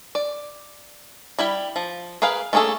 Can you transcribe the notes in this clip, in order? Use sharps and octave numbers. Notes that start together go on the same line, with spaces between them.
D5
G3 E4 G5 B5
F3
G#4 A#4 B4 F5
A3 A#3 C#4 G#4 A4